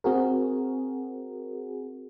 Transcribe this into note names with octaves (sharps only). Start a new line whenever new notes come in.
C4 F#4 G#4 A#4